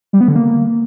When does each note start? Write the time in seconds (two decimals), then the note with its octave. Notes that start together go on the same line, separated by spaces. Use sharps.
0.13 G3
0.21 B3
0.28 D3
0.36 A#3